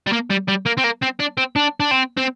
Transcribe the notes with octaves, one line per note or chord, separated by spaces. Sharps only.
G3
A#3
G3
G3
A#3
C4
A#3
C4
D4
C4
D4
D4
C4
C4